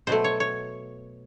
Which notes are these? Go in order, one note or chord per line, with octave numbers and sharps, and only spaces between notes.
B2 F#3 A3 C5
C#5
C#5